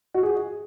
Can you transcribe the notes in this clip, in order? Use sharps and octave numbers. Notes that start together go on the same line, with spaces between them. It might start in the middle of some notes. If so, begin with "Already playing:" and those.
F#4
G#4